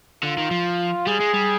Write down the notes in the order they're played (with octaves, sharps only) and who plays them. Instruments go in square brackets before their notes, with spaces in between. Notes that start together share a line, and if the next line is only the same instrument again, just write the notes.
[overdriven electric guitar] D3 [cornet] F4
[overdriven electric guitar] D#3
F3
[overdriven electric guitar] G3 [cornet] G#4
[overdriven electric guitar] G#3
G3